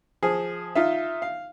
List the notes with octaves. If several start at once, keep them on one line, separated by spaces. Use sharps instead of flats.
F3 G#4
D#4 F4 E5
F5